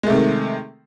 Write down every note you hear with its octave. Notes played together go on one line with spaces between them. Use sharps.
C3 D#3 G#3 A3